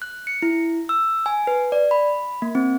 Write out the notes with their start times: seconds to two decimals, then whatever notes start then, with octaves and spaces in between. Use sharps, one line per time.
0.02 F#6
0.27 C#7
0.42 E4
0.89 E6
1.26 G#5
1.47 B4
1.72 D5
1.91 B5
2.42 A#3
2.55 C4